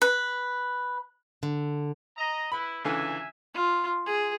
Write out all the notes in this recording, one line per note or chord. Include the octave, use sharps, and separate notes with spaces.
B4
D3
D#5 A#5
E4 B4 B5
C#2 D3 E3 E5 G#5
F4
G#4